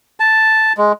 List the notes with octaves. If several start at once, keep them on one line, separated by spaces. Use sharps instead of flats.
A5
G#3